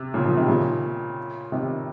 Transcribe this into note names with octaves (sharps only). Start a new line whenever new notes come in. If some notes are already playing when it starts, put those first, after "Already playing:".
Already playing: C3
A#2 C#3
C#3 F3
C3 D#3
A#2 C#3
C3 D#3